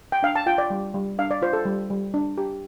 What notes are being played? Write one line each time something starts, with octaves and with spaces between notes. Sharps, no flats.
G5
D4 F5
A5
F4 G5
D5
G3
G3
D4 F5
D5
F4 C5
A4
G3
G3
D4
G4